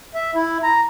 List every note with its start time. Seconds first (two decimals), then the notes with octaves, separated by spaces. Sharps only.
0.15 E5
0.35 E4
0.63 A#5